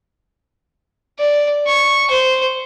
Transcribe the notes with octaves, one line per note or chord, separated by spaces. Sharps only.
D5
C#6
C5